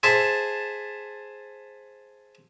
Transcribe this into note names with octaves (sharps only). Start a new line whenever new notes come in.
G#4 C5 E5 A5